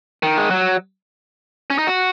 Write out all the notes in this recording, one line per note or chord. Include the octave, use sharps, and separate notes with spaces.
D#3
G#3
F#3
C#4
D#4
F#4